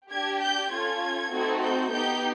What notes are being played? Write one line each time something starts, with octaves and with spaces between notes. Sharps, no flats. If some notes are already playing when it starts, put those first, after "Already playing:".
D4 G4 G#6
G6
C#4 F4 A4 G#6
A3 C4 D#4 F#4 A4
G6
B3 D#4 G4 G6